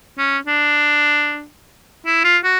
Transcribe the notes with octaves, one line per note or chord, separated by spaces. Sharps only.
C#4
D4
E4
F4
F#4